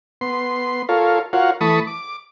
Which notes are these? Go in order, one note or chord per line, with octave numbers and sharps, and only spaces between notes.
B3 C6
F4 A4 A#4 C#5 F5
F4 F#4 A#4 C#5 F5 F#5
E3 A3 A5 B5 C#6 D#6
D6